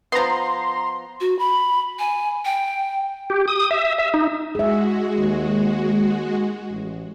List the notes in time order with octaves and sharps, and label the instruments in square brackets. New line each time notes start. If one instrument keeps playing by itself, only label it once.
[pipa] F3 B3 [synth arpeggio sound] A#5 C6
[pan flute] F#4
B5
G#5
G5
[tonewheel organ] G4
D#6
E5
E5
D#4
[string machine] G#3 F#4 [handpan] G#4 E5
[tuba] D#2
A1